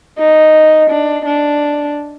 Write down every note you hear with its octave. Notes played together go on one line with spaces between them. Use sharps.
D#4
D4
D4